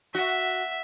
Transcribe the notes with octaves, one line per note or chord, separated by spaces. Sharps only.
F#4 E5